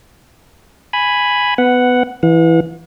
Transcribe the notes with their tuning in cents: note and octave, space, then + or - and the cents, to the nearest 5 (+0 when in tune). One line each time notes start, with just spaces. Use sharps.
G#5 +0 B5 +0
B3 +15 F#5 +0
E3 +0 F#5 -45